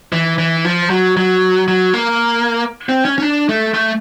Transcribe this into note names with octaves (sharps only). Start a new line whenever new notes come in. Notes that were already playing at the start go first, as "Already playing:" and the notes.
E3
E3
F3
F#3
F#3
F#3
A#3
C4
C#4
C#4
D4
A3
A3